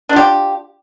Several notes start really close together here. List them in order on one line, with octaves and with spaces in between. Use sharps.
D4 F4 G4